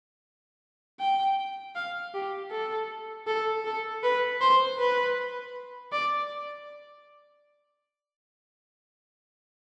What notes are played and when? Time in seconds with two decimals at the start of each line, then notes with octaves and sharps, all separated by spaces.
1.00 G5
1.75 F5
2.14 G4
2.51 A4
3.27 A4
3.65 A4
4.03 B4
4.41 C5
4.78 B4
5.92 D5